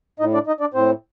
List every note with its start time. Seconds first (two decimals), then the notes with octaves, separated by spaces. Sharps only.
0.19 A2 D#4 D#5
0.34 D4 D5
0.47 D#4 D#5
0.60 D4 D5
0.74 A2 C4 C5